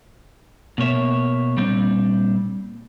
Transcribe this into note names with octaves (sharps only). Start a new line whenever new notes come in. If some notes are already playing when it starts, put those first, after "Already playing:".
B2 A#3 C#5 E5
A#2 G3 C4 D4